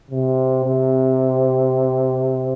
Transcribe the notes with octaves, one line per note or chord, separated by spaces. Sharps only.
C3
C3